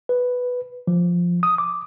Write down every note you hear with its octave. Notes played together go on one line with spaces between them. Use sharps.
B4
F3
D#6
D6